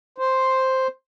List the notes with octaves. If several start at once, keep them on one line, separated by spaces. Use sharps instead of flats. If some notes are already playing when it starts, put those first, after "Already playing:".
C5